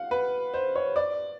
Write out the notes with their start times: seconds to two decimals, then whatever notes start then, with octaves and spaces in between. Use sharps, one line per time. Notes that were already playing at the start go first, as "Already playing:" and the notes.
Already playing: F5 F#5
0.11 B4
0.54 C5
0.76 C#5
0.96 D5